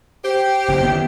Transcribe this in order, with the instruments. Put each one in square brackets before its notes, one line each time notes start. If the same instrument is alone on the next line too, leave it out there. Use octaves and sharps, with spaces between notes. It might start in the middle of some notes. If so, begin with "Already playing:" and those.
[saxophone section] G4 C5
[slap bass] F#1 F#2 C#3
D#3 B3